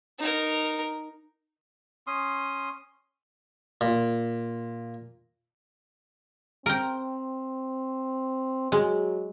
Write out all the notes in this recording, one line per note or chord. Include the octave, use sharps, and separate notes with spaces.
D#4 A#4
C#4 C6 D#6
A#2
C4 A#4 G5
F#3 G#3